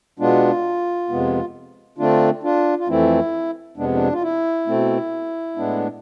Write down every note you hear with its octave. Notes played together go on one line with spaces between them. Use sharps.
B2 G#3 B3 D4 F4
F2 C3 G#3 B3
D3 A3 C4 D4 F4
D4 F4
F4
F2 E3 A3 C4 E4
F2 C3 G#3 B3 D4
D4
F4
E4
B2 A3 C4
A2 G#3 B3 D4